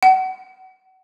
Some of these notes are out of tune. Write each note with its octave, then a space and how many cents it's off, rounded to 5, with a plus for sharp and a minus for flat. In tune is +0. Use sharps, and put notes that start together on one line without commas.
F#5 +30